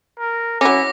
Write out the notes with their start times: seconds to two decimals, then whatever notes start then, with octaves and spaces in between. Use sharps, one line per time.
0.19 A#4
0.61 F#3 C#4 E4 D6 A#6